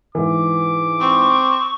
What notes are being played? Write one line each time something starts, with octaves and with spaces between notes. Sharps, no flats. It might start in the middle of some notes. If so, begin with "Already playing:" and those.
G#2 E3 D6
C4 C#6